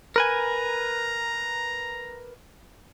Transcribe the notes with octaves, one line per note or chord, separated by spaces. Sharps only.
A#4 B4 G#5 A#5